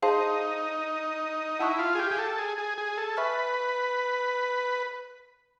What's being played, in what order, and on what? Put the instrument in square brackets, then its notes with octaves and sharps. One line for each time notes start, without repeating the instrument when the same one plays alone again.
[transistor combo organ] D#4 [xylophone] G#4 C5 F5 A5 C6
[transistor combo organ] E4 [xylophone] F#5 A5 C#6 F#6
[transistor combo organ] F4
G#4
G4
G#4
A4
G#4
G#4
G#4
A4
[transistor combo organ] B4 [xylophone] E5 G#5 C#6 F6